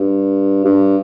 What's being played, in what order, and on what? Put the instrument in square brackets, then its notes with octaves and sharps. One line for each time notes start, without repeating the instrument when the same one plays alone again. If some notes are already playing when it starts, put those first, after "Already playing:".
Already playing: [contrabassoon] G2
G2